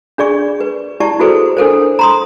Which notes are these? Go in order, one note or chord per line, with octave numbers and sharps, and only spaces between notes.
D4 G#4 D5 C#6
B4
E4 G4 D5 A5 C#6
E4 F#4 G#4 A4 B4 C5
D4 A4 A#4 C5
A#5 C6 D#6